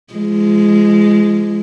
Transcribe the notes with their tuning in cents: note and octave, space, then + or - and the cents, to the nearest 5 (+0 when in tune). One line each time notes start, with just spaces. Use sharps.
F3 -40 G#3 +0